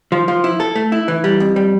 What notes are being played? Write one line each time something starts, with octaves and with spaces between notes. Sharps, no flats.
F3
F3
E4
A4
A3
E4
E3
G3
F2
G3